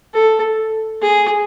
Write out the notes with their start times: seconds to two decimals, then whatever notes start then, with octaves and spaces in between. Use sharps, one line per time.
0.14 A4
1.01 G#4